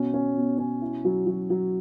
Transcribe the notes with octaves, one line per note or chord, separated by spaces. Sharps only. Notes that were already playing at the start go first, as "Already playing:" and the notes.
Already playing: B2 C#4
C#4
B2
C#4
E4
F#3
F#3
F#3